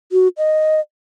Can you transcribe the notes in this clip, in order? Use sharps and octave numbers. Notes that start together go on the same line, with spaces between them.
F#4
D#5